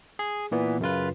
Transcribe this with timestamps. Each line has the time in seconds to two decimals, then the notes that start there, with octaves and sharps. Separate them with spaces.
0.19 G#4
0.52 A#2 E3 B3
0.81 F#2 C#3 F4 B4